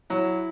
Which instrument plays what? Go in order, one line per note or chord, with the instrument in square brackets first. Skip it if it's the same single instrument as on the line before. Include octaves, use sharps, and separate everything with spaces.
[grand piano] F#3 [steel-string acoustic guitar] E4